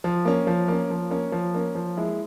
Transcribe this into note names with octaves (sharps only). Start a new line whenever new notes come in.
F3
A#3 C#4
F3
A#3 C#4
F3
A#3 C#4
F3
A#3 C#4
F3
G#3 E4